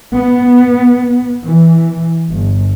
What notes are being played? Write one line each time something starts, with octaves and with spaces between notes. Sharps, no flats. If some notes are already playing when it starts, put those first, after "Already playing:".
B3
E3
G1